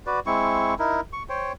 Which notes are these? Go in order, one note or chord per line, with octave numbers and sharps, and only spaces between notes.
F#4 B4 D5
G#3 C4 E4 C#6
D#4 E4 A#4
C#6
C5 C#5 G5